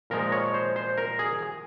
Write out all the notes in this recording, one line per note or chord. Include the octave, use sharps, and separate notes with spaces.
A#2 F3 G#3 A#4
C#5
C5
C5
A#4
G#4